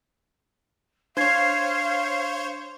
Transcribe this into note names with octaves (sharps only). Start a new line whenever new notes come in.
D4 C5 C#5 F5 G#6 C7